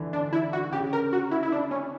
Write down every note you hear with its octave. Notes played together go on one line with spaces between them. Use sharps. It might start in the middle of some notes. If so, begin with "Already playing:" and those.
Already playing: D3 E3
D4
E4
F#4
C#3 G4
A#4
F#4
E4
E4
D4
C#4